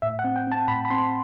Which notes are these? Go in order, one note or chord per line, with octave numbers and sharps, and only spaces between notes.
A2 E5
F#5
C4
G5
C4 A5
A2 B5
B5
C4 C6